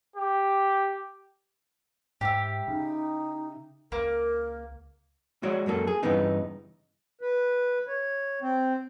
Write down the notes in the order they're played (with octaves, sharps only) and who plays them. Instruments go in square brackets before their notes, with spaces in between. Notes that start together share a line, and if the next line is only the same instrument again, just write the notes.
[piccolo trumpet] G4
[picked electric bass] G#2 [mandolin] E4 G4
[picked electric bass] C#3 [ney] D#4
[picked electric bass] C#2 [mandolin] A#3 [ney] A#4
[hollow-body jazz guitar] G#3 F#4 C#5 D5
F#2 F#3 A#3 G#4 A4
G#4
G2 C#3 E3 B3 D#4
[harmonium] B4
C#5
C4